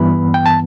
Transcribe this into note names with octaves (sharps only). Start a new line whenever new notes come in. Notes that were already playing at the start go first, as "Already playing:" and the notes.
Already playing: G2 E3 B3 B5
G5
A5